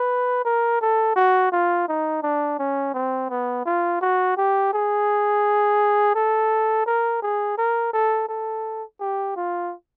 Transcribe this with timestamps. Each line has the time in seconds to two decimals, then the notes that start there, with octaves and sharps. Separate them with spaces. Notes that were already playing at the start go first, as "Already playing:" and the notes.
Already playing: B4
0.45 A#4
0.81 A4
1.16 F#4
1.52 F4
1.89 D#4
2.23 D4
2.59 C#4
2.94 C4
3.30 B3
3.65 F4
4.01 F#4
4.37 G4
4.73 G#4
6.15 A4
6.86 A#4
7.22 G#4
7.58 A#4
7.93 A4
8.29 A4
9.01 G4
9.36 F4